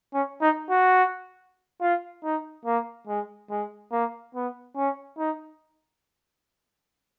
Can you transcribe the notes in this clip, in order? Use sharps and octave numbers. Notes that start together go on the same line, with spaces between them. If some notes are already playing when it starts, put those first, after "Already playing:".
C#4
D#4
F#4
F4
D#4
A#3
G#3
G#3
A#3
B3
C#4
D#4